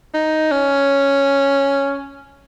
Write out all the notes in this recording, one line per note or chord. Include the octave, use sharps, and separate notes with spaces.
D#4
C#4